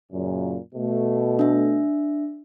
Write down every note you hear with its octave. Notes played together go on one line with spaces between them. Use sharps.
F#2 A#2 C#3
B2 A3
D4 E5